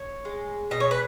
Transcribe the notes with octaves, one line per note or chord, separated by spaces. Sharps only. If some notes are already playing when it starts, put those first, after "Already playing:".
Already playing: C#5
G#3
B2 D#5
C#5
B4